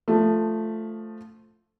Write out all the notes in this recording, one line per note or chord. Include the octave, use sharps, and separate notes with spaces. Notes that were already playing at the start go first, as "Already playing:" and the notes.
F3 A3